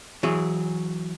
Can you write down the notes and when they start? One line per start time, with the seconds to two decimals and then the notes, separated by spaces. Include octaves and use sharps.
0.23 E3 F#3 G#4